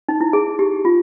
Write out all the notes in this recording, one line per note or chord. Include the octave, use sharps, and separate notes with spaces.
D#4
E4
G#4
G4
F4